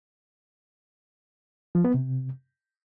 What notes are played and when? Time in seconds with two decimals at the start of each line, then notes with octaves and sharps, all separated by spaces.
1.75 F3
1.85 B3
1.94 C3